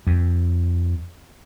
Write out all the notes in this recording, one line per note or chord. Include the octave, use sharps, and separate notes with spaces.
F2